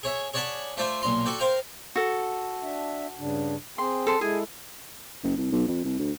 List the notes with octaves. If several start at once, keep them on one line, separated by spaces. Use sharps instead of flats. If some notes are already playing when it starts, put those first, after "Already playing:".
G#4 C#5 E5
G#4 C#5 D5 F#5 A5 B5
A3 F4 C5 D5 E5
B1 A#2 A#5 C6
F#4 A4 D5 G5
A#4 C5 F5 G5 A#5
F#4 A4
D4 E5
G2 C#3 D4
C4 G#4 G5 C6
A4 C6
G#3 E4 G#4 A4 G#5
F#1
C2
B1
F2
C2
D2